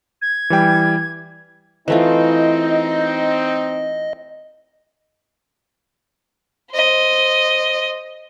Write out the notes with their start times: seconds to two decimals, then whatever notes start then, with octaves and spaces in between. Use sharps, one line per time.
0.22 G#6
0.50 E3 G3 G5
1.88 E3 A3 C4 D#4 F4 D#5
6.72 C5 D#5